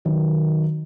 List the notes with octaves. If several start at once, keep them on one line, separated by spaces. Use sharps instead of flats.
D#3 F#3